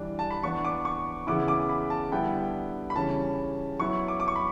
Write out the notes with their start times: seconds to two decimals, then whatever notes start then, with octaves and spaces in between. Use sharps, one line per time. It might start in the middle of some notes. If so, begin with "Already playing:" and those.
Already playing: E3 G3 D4
0.19 A5
0.31 B5
0.43 E3 B3 D4 C#6
0.65 D6
0.85 C#6
1.27 C#3 E3 B3 E4 D6
1.48 D6
1.69 B5
1.90 A5
2.12 D3 G3 B3 E4 G5
2.90 B5
2.95 C#3 E3 G3 C#4 A5
3.80 F#3 B3 E4 C#6
4.08 D6
4.20 D6
4.28 C#6
4.36 B5